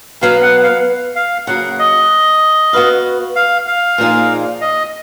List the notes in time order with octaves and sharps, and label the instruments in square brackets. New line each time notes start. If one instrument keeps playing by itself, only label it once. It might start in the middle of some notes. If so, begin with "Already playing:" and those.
[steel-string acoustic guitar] B2 F#3 B3 [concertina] F5
[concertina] F#5
F5
F5
[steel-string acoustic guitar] C#3 F#3 A#3 [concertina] F#5
[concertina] D#5
[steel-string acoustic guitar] B3 F#4 B4 F5
[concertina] F5
F5
[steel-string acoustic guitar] A#2 F3 A#3 D#4 G#4
[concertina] D#5